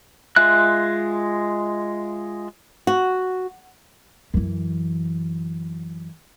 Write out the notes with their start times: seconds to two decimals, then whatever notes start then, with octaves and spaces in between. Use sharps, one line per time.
0.36 G#3 F4 E5 F#6
2.87 F#4
4.34 F#2 E3